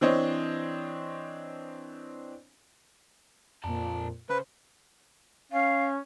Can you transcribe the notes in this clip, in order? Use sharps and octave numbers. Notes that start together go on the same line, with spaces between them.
E3 C4 D4 C5 C#5 D#5
F2 A#2 D5 A5 A#5
C#3 C#4 B4 C5
C#4 F5